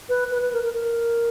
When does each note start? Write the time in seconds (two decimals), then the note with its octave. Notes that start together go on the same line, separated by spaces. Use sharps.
0.09 B4
0.31 B4
0.42 B4
0.53 A#4
0.64 A#4
0.74 A#4